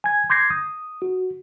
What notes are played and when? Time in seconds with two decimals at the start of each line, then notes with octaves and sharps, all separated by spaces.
0.04 G#5 G#6
0.30 C6 D6 G6 G#6 A#6 C7
0.51 D#6
1.02 F#4